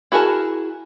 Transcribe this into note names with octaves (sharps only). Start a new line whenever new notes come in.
E4 F#4 G#4 A#4 A5